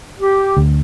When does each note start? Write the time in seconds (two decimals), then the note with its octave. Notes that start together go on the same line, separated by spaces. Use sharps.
0.20 G4
0.57 D2